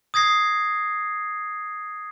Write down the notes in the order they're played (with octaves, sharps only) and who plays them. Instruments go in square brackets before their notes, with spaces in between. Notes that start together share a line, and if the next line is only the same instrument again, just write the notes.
[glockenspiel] D#6 G#6 A#6 C7